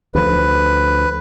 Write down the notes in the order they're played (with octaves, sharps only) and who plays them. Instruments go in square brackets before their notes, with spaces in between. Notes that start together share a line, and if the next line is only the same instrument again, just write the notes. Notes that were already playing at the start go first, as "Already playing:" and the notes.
[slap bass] D2 F3 [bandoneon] B4